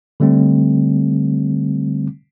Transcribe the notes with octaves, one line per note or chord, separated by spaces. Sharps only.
D3 G3 A3 C4